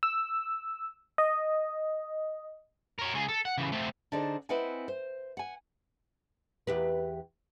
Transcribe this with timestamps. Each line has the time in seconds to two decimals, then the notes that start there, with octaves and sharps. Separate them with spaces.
0.03 E6
1.18 D#5
2.99 A#4 C#5
3.14 C#2 G#4
3.28 A4
3.45 F#5
3.58 C#3 E3
3.72 A3 C4
4.12 D3 D4 D#4 G#4 C5
4.49 C4 E4 B4 D#5 F#5 G#5
4.88 C5
5.37 F#5 G#5
6.67 E2 G4 B4